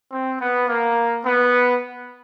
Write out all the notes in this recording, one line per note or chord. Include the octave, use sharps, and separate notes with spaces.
C4
B3
A#3
B3